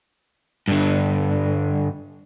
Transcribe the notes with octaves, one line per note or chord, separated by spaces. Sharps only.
G2 D3